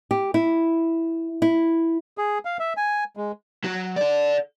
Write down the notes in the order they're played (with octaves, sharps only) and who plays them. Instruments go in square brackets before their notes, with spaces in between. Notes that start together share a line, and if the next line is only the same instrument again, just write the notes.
[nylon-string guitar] G4
E4
E4
[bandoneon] G#4
F5
E5
G#5
G#3
[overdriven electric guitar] F#3 F#4
A4 D5